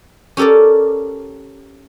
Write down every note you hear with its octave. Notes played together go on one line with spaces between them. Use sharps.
C#4 G4 A4 A#4 D5